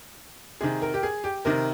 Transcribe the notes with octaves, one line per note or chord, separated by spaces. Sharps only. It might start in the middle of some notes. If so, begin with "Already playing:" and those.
C3 D#3 G#4
A#4
G4
G#4
G4
C3 D#3 A#4